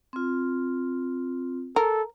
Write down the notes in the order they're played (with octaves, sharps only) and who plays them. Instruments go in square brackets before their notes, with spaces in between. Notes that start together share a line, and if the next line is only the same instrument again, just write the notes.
[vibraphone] C4 F4
[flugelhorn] A4 [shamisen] A#4